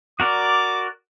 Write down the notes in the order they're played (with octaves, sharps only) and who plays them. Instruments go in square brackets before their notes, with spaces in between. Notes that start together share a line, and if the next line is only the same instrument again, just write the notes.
[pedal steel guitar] F#4 A#4 D5 [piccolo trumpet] D6